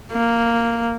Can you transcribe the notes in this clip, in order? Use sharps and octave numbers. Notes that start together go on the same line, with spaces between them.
A#3